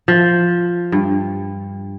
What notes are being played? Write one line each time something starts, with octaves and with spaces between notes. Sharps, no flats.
F3
G2